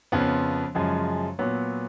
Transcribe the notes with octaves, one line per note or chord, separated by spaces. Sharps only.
F2 C#3 F3 B3
F#2 C#3 F3 G#3
A#2 F#3 B3